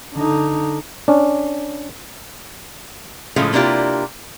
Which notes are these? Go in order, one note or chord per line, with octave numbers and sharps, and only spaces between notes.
D3 D#4
C#4 D4
A2 C#3 F3 G#3 A3
C3 A#3 D4 E4 F4 G4